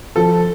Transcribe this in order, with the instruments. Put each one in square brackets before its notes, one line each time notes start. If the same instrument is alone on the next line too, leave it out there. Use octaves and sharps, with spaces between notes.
[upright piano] F3 [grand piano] A4